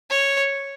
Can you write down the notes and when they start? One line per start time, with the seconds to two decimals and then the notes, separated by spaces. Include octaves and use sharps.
0.10 C#5